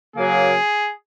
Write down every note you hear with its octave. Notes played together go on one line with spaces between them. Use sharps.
C#3 F#3 A#3 G#4